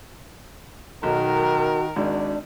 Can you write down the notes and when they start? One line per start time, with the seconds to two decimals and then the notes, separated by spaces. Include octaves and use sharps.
1.03 B1 D#3 F#4 A#4
1.96 G#1 G#2 D4 F#4